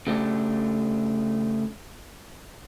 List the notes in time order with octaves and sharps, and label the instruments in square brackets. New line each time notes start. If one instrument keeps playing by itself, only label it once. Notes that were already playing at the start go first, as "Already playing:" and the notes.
[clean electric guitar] C#3 A3 D4 G4